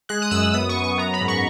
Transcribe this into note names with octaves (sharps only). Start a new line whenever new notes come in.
G#3 F#6
D#6
F#2 E6
B3 D#6
C#6
F#2
C#6
B3 A#5
B5
G#2
C#6